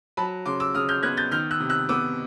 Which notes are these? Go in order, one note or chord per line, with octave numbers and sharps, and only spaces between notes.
F#3 A5 B5
C#3 C6 D6
D6 E6
C#3 D#6 F6
F6 G6
B3 F#6 G#6
G6 A6
D#3 F6 G6
E6 F#6
C3
E6 F#6
B3 D6 E6